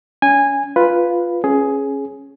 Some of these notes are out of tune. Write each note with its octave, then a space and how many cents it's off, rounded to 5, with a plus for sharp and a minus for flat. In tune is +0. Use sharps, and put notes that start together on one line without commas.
C#4 +30 G#5 -15
F4 +0 B4 +0
C#4 -15 G#4 +10